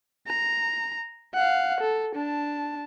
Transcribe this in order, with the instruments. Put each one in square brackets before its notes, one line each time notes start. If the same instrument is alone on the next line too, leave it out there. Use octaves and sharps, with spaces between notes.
[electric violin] A#5
F5 F#5
A4
D4 A5